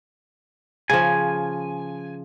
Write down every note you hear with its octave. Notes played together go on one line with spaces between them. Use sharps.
C#3 F3 G#5